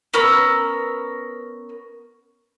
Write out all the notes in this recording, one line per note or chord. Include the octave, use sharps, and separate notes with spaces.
B3 C#4 A#4 E6